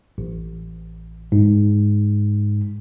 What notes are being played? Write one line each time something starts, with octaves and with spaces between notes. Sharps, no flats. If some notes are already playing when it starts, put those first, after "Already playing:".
A1
G#2